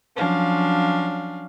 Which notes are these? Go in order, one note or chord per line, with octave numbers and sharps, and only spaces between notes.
F3 F#3 C#4 D4 F5